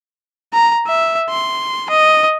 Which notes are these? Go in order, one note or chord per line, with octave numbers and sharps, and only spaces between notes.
A#5
E5
C6
D#5